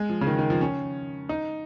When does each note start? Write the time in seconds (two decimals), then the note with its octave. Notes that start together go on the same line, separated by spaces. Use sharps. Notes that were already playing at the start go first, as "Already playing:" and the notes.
Already playing: G#3
0.10 F3
0.21 C#3
0.27 D#3
0.38 D#3
0.50 F3
0.61 C#4
1.29 D#4